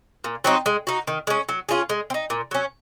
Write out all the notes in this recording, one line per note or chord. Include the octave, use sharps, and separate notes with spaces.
A#2
F#3 C4 D#4
G#3
D#4 F#4
D#3
G#3 C#4
F#3
C#4 F4 G#4
G#3
C4
D#4
A#2
F#3 C#4